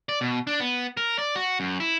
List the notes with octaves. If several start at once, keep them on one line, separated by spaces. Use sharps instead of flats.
D5
B2
D4
B3
A#4
D5
F#4
F#2
E4